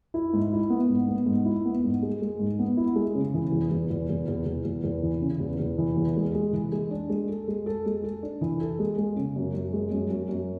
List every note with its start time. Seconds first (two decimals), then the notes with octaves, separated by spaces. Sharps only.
0.14 E4
0.33 G#2
0.52 E4
0.70 B3
0.89 G#2
1.08 B3
1.26 G#2
1.45 E4
1.65 B3
1.84 G#2
2.02 G#3
2.22 G#3
2.39 G#2
2.59 B3
2.77 E4
2.96 G#3
3.15 C#3
3.34 E3
3.52 E2
3.71 E2
3.90 E2
4.09 E2
4.28 E2
4.46 E2
4.65 E2
4.84 E2
5.03 E3
5.22 C#3
5.40 E2
5.59 E2
5.78 E3
5.97 E2
6.17 G#3
6.35 G#3
6.53 E3
6.72 G#3
6.91 D4
7.09 G#3
7.29 A4
7.48 G#3
7.66 A4
7.86 G#3
8.03 A4
8.23 D4
8.41 E3
8.61 A4
8.79 G#3
8.98 G#3
9.16 C#3
9.36 F#2
9.55 F#2
9.73 G#3
9.92 F#2
10.10 F#2
10.29 F#2